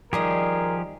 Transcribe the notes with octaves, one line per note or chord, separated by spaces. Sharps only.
D#3 F3 G3 G4 G#4 A#4 D#5